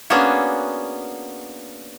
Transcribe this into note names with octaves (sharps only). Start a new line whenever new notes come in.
A#3 B3 C#4 D4 F#4 G#4